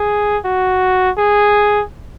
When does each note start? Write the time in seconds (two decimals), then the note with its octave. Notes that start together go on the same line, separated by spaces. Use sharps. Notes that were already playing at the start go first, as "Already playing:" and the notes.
Already playing: G#4
0.45 F#4
1.18 G#4